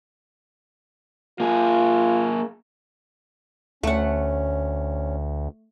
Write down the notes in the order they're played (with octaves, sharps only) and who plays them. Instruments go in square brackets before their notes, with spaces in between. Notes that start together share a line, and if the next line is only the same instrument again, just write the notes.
[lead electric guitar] A#3 G#4 [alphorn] F4
[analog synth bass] D2 [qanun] A3 F#5 [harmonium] C#4